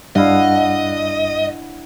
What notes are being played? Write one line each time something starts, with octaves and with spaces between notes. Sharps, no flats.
G2 D4 E4 D#5 F5 F#5